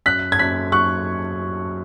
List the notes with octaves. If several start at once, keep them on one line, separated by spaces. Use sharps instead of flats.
F#2 F#6 B6
G#6
F#2 F#6 B6
F#3 C#6 F#6